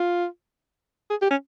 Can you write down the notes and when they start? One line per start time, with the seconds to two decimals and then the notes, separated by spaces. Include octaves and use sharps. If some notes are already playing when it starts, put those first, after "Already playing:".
Already playing: F4
1.10 G#4
1.22 G4
1.31 C#4